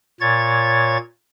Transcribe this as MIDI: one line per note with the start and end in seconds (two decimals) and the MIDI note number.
0.21 0.97 46
0.21 0.97 73
0.21 0.97 92
0.21 0.97 93